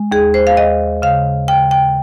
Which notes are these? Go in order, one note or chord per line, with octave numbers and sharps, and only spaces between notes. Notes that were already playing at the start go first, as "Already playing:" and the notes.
Already playing: G#3
D#2 G#4
C5
F5
D#2 D#5
C#3 F5
C#3 G5
G5